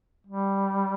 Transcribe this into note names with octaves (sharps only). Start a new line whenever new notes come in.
G3